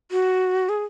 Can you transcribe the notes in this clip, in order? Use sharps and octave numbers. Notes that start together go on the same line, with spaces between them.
F#4
G#4